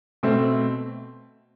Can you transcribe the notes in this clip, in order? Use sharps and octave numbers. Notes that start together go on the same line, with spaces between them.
B2 A3 C4